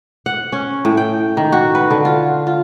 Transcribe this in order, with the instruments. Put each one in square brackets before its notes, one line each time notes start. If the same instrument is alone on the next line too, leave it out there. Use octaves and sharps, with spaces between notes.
[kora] F#5
C#4
A2
G5
D#3
F#4
B4
D3
F4
F4